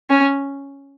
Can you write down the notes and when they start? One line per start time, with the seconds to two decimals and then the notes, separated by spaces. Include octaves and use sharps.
0.10 C#4